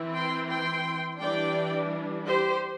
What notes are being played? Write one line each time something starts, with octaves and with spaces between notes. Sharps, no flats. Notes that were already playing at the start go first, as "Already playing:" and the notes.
Already playing: E3 C4 E4
G5 C6
G5 C6
E3 G3 D4 D5 G5
G4 C5